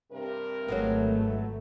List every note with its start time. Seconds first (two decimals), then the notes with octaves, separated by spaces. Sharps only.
0.12 G2 C3 A#4
0.68 G#1 F#3 G#3 A3 B3